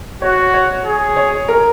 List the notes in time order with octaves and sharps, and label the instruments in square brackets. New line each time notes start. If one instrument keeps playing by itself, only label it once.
[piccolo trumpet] F#4 [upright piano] C#5
[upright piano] C#5
[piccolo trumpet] G#4
[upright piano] C#5
A#4